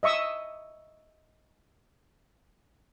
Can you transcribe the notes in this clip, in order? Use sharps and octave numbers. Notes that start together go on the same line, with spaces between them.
D#5 E5 C#6 D#6 E6